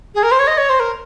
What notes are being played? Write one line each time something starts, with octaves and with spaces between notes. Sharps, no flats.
G#4
A#4
C5
C#5
D#5
C#5
C5
A#4